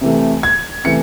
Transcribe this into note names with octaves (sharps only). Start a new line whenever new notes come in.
C3 E3 A3
G#6
C3 E3 A3 C#7